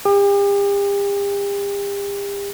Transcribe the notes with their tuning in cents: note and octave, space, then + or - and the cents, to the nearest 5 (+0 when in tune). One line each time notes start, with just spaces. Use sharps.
G4 +40